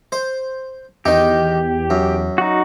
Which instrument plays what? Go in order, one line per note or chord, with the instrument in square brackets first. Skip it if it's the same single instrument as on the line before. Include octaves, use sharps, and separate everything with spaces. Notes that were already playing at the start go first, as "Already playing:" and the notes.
[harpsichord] C5
[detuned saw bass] E2 [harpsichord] D#3 D#4 [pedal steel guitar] G4
[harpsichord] F#2
[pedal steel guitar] D#4 F#4